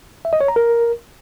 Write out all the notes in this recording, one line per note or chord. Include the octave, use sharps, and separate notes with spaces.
E5
D#5
C#5
A#5
A#4